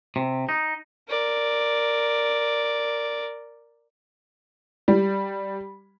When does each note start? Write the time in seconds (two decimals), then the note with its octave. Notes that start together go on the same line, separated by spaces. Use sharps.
0.16 C3
0.49 D#4
1.09 A#4 D5
4.88 G3